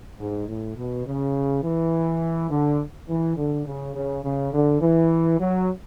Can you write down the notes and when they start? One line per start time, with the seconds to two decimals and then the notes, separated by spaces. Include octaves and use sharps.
0.19 G#2
0.47 A2
0.76 B2
1.06 C#3
1.63 E3
2.50 D3
3.08 E3
3.36 D3
3.65 C#3
3.94 C#3
4.23 C#3
4.53 D3
4.81 E3
5.39 F#3